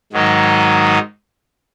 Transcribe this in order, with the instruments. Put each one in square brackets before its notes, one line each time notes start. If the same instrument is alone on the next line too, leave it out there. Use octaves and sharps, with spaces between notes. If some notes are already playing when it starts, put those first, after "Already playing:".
[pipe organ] G#2 D#3 F#3 D#4